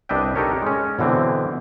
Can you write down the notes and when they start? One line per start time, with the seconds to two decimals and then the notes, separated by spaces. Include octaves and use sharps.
0.09 C2 D4 B4 D#5 E5 G5
0.35 D#4 G4 A4 A#4 C#5
0.62 G#3 C#4
0.99 B2 D3 E3 C4